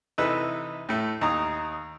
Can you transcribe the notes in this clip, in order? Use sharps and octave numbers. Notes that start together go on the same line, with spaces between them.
C3 E3 D#4 A4 B4
A2 A3
D#2 D#4 A#5 D#6